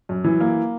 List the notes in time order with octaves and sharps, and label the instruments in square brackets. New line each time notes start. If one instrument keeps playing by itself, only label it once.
[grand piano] F#2
E3
A#3